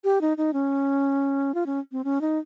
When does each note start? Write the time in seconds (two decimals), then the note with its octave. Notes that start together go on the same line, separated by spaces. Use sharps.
0.04 G4
0.21 D#4
0.37 D#4
0.53 C#4
1.54 F4
1.66 C#4
1.92 C4
2.04 C#4
2.21 D#4